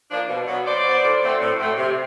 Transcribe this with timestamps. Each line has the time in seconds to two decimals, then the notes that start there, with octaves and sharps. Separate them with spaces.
0.11 F3 A#3 D4
0.29 B2
0.48 F#3 B3
0.65 B2 C5 D5
0.84 F#3 B3
1.03 A2
1.22 F#3 A3 C4
1.40 A2
1.58 F#3 A3 C4
1.78 C3